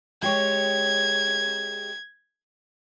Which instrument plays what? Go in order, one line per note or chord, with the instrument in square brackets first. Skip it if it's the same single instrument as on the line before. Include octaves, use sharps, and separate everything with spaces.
[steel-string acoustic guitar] G#3 G4 C#5 [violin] G#6